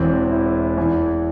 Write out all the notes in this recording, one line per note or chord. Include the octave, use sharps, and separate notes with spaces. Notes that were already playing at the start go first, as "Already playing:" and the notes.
Already playing: E1 E2 E3 C4
E4
E2 E3